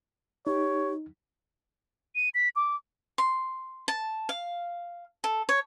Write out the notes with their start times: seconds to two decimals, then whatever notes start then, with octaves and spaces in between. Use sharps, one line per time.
0.47 D#4 G4 C#5
2.15 D#7
2.34 B6
2.56 D6
3.18 C6
3.88 A5
4.29 F5
5.24 A4
5.49 C#5